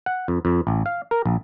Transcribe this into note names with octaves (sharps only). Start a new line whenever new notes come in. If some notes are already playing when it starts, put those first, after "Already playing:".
F#5
F2
F2
A1
F5
A#4
A#1